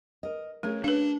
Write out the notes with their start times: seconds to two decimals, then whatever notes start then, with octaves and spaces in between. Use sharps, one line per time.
0.23 A#4 D#5
0.63 A3 C#4 G#4 A#4
0.84 D4 B4 F5